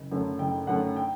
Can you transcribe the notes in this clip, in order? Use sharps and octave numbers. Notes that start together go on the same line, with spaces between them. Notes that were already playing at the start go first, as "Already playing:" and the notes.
Already playing: F#1
F#2 D3 A3
F#1 G5
F#2 D3 A3 F#5
G5